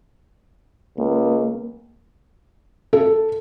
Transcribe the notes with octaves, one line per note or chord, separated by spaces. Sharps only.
C#2 A#3
A4